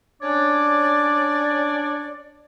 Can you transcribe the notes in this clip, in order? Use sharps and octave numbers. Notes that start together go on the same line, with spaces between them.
C#4 D4 C#5 D5